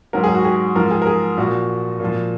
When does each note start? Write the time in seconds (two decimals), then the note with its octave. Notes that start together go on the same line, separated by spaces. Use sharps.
0.13 G#2 F#3 A#4
0.24 G#4
0.35 F#4
0.45 G#4
0.76 G#2 F3 A#4
0.91 G#4
1.02 A#4
1.07 G#4
1.38 A#2 F3 F#4
2.00 A#2 F3